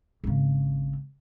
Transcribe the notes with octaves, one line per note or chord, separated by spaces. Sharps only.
G#1 C#3